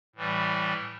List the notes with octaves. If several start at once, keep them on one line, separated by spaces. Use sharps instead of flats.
A2 E3 G3